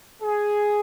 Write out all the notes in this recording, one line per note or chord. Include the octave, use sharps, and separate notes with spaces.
G#4